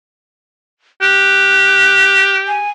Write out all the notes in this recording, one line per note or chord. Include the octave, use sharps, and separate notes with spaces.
G4 F#6
G#5